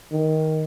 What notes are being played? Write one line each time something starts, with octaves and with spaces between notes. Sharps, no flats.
D#3